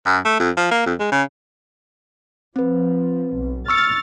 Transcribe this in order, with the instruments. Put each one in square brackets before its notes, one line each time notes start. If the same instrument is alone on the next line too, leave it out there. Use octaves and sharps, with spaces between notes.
[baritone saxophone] F#2
A3
F2
F3
A#3
F2
G#3
C#3
[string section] F3 [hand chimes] C4 B4
[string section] B1
[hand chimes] C#6 E6 C#7 [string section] F6 A6